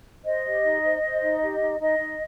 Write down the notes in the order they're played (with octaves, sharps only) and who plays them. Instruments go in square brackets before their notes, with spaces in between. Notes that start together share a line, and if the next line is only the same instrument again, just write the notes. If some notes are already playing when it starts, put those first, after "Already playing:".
[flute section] C5 D#5
G4
D#4
C5
C5
D#4
G4
D#4
D#4 D#5
D#4